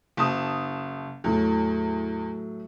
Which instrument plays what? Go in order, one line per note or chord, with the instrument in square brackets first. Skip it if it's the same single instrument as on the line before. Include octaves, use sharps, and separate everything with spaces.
[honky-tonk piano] F#1 A5 D#6
[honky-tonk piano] E2 [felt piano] A2 F#3 A3